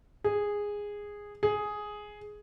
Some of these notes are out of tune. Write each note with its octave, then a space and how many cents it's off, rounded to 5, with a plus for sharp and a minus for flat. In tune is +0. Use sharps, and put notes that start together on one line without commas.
G#4 -10
G#4 +5